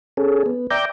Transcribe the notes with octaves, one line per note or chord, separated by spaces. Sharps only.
C#4 G#4 A4
B3
D5 E5 G5 A#5 D6 G6